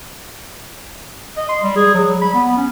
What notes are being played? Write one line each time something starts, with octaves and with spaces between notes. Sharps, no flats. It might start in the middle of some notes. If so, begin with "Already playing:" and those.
D#5
C6
G3
G#4
F#3
G3
B5
B3
C#4